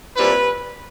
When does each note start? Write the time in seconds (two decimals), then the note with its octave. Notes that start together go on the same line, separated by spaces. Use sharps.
0.16 A#2 G3 C4 E4 B4